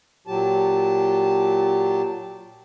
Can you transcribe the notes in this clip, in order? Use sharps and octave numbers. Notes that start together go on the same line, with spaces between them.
A#2 F#3 G4 A5